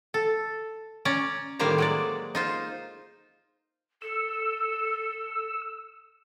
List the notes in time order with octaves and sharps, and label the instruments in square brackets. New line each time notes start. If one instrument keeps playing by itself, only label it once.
[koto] A4
C#4 D5 A#5
A2 D#3 G3 A#3 C5 A#5
F#3 G#3 D5
D#4 F4 C5
[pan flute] A4 [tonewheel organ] E6